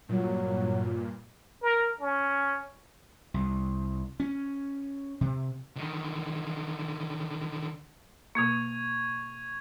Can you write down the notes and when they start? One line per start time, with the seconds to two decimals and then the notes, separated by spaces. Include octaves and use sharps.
0.09 G2 A#2 F#3
1.62 A#4
2.01 C#4
3.34 C2
4.20 C#4
5.21 C3
5.76 D3 D#3
8.35 B2 A#3 C#6 G#6 F7